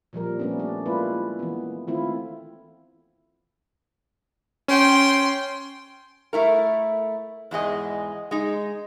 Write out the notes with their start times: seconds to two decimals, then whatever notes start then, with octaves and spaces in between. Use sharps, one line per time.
0.13 A#2 F3 G3 A#4
0.39 G3 A3 B3 C#4 D4
0.60 D4
0.86 G#3 A#3 E4 F4 B4
1.39 E3 B3
1.87 D#3 E3 A3 C4 E4 F4
4.68 C#4 G5 C6
6.33 A3 E4 A#4
7.51 E2 G#2 G#3 D#5
8.31 G#3 D#4